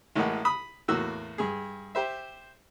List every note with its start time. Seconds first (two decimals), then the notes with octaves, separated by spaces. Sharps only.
0.15 A1 A2 G#3 A#3 F#5
0.45 B5 D#6
0.88 E2 A2 A#3 F#4 E6
1.38 G2 G#4
1.95 G4 C5 E5